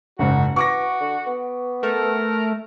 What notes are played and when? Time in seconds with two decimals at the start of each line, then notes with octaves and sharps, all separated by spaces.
0.19 F#1 G#2 C#3 F#4
0.56 E3 F#4 C#6 D6 A#6
1.00 D3
1.26 B3
1.83 A3 A#4